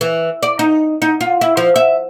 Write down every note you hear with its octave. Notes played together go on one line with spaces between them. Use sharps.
E3
D5
D#4
D#4
F4
E4
F3
E5